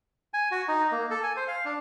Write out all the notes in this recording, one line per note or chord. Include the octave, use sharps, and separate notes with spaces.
G#5
F#4
D#4
A#3
A4
G#5
C5
F5
D4